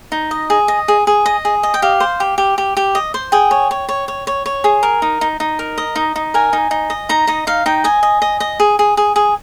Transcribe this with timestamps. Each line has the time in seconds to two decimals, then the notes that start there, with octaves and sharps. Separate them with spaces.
0.12 D#4
0.31 D#5
0.50 G#4
0.68 D#5
0.88 G#4
1.07 G#4
1.26 D#5
1.45 G#4
1.63 D#5
1.74 G5
1.82 G4 F5
2.00 C5
2.20 G4
2.38 G4
2.58 G4
2.77 G4
2.95 D#5
3.14 C5
3.32 G#4 G5
3.51 C#5
3.71 C#5
3.89 C#5
4.08 C#5
4.27 C#5
4.46 C#5
4.64 G#4
4.83 A#4
5.02 D#4
5.21 D#4
5.40 D#4
5.59 A#4
5.78 D#5
5.96 D#4
6.16 D#4
6.34 A#4 G#5
6.53 D#4
6.71 D#4
6.90 D#5
7.09 D#4 A#5
7.27 D#4 D#5
7.47 D#4 F5
7.66 D#4 G5
7.84 D#5 G#5
8.03 D#5
8.22 D#5
8.40 D#5
8.60 G#4
8.79 G#4
8.97 G#4
9.16 G#4